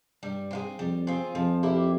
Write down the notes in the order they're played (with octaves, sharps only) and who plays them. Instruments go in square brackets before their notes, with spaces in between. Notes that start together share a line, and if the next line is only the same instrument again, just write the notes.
[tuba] G2 [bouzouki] G3
[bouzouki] C4 F4 G#4
[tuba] F2 [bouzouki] G3
[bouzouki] C4 F4 G#4
[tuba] F2 [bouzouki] F3
[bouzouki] A#3 E4 G4